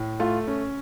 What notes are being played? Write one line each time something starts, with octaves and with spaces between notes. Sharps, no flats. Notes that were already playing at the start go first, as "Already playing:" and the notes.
Already playing: A2
A3 F4
C#4